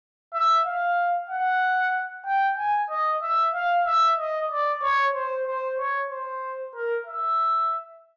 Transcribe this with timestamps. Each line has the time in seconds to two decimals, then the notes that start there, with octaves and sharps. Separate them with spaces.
0.34 E5
0.65 F5
1.30 F#5
2.26 G5
2.58 G#5
2.90 D#5
3.23 E5
3.54 F5
3.86 E5
4.18 D#5
4.50 D5
4.83 C#5
5.14 C5
5.47 C5
5.79 C#5
6.11 C5
6.75 A#4
7.07 E5